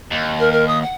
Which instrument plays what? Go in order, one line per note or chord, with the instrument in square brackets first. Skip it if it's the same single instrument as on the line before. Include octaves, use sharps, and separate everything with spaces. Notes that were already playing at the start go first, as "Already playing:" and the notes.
[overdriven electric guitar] D#2
[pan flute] A#4
A#4
D#6
F#5